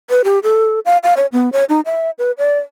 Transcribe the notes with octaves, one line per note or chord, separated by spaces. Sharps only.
B4
G4
A4
F5
F5
C#5
B3
C#5
D#4
E5
B4
D5